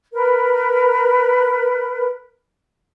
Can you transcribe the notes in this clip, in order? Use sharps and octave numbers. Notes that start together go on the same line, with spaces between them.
A#4 B4